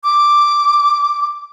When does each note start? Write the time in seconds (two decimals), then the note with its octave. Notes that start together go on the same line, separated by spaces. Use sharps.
0.04 D6